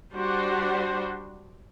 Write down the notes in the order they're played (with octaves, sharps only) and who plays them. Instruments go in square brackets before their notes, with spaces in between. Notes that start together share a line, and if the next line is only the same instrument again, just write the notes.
[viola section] G3 D4 F#4 C5